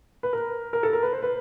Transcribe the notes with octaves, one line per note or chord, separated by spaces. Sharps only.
B4
A#4
A#4
A4
A#4
B4
C5
B4